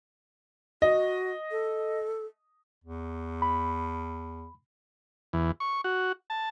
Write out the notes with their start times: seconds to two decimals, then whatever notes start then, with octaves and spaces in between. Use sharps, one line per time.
0.82 F#4 D#5
1.51 A4
2.84 E2
3.42 B5
5.33 E2
5.60 C#6
5.84 F#4
6.30 A5